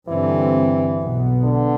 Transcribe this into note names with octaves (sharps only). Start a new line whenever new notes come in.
G2 D3 E3 G3 C4
B1 B2 B3
D3